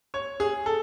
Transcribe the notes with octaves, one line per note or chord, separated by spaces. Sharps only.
C#5
G#4
A4